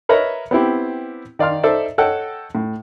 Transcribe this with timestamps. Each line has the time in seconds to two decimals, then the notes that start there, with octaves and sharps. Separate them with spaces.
0.09 A#4 B4 C#5 D#5 E5 A#5
0.51 B3 C4 E4 G4
1.39 D#3 D5 F5 C6 F6
1.63 D#4 A4 C5 D5 E5
1.98 A4 C#5 D#5 F#5 G5 A5
2.55 A2